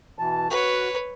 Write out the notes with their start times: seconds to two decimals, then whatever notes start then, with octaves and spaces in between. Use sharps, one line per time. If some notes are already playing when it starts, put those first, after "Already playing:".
0.19 B2 E3 A5
0.50 F#4 B4 C#5